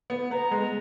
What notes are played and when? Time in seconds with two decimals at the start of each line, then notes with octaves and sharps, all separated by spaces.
0.10 B3
0.31 B3 A#5
0.51 G#3